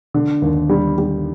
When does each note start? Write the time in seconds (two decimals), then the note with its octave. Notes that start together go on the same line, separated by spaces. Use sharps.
0.14 D3
0.42 D#2
0.69 G3
0.98 G3